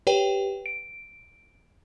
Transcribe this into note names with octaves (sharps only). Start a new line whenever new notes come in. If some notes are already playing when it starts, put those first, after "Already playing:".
G4 B4 C#5 G5
D7